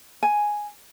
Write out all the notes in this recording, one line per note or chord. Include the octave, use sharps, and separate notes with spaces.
G#5